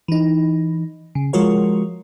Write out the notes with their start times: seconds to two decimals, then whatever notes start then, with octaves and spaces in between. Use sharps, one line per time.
0.08 E3 D#4
1.15 C#3
1.33 F3 G#3 F4 F#4 A#4 C#5